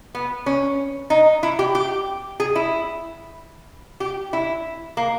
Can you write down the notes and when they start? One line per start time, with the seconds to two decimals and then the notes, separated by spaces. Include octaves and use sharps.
0.15 B3
0.46 C#4
1.10 D#4
1.43 E4
1.59 G4
1.75 G4
2.40 G#4
2.55 E4
4.00 G4
4.33 E4
4.97 A#3